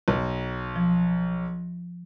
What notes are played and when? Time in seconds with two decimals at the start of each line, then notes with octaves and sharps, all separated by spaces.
0.08 B1
0.76 F3